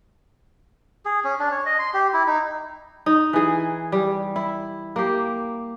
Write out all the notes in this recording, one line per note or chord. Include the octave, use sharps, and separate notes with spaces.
G#4
C#4
D4
C#5
D#5
C6
G4
E4
D#4
D#4
E3 G#4
G3
E4
A#3 G4